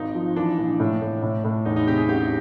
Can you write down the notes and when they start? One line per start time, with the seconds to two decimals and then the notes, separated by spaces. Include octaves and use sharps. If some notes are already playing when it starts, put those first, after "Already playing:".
Already playing: G#1 D#4
0.15 F3
0.36 E3 D4
0.58 A#1
0.80 A2
1.01 A2
1.22 A2
1.44 A2
1.65 E2 D#4
1.76 D#4
1.87 C3 G4
1.98 G#4
2.08 A1 G4